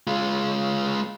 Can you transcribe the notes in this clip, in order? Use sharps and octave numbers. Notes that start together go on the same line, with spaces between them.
G#3 F4